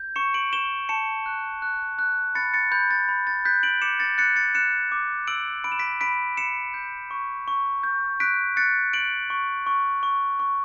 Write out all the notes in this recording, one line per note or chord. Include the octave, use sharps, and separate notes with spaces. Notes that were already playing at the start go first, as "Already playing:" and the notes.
Already playing: G6
C#6 C#7 E7
D7 F#7
C#6 E7 G7
A5 C#7 E7
F#6
F#6
F#6
B5 A6 C#7
A6 C#7
B5 G6
A6
B5
A6
F#6 G6 B6
D7 F#7
D6 C#7 E7
A6 C#7
F#6 A6 C#7
A6 C#7
F#6 C#7 E7
D6
E6 D7 F#7
B5 D7
E7
B6 D7
B5 B6 D7
B5 C#7 E7
G6
C#6
C#6
G6
F#6 B6 D7
F#6 A6 C#7
F#6 D7 F#7
C#6
C#6
C#6
C#6